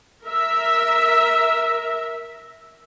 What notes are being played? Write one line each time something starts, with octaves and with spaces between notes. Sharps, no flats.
A#4 E5